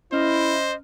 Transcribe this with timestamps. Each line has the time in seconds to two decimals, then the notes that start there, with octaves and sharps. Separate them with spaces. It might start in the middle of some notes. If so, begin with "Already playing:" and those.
0.12 C#4 E4 C5 D#5 F6